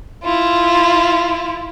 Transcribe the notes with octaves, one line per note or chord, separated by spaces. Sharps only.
E4 F4